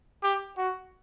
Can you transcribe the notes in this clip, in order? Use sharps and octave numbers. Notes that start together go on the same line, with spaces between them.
G4
F#4